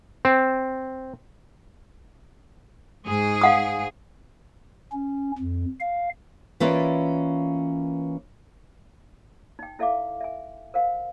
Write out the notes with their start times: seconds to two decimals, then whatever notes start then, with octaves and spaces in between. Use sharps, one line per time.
0.25 C4
3.05 G#2 G#4
3.41 F5 F#5 D#6
4.92 C#4
5.38 F2
5.80 F5
6.60 E3 A#3 C#4 F4 B4 D5
9.59 D#4 G5
9.79 E4 A4 E5 F5 D6
10.20 E5 G#5
10.74 A#4 C5 F5 F#5